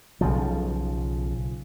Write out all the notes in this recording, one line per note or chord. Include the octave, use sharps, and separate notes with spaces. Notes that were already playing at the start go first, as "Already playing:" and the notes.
B1 C#3 F3